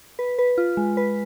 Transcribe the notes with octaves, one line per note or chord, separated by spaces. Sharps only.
B4
B4
F4
G#3
B4